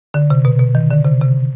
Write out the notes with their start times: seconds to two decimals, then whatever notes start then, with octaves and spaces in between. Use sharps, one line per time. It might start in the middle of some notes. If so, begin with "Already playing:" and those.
0.14 D3
0.30 C3
0.45 B2
0.60 B2
0.75 D#3
0.91 D3
1.05 C3
1.21 C3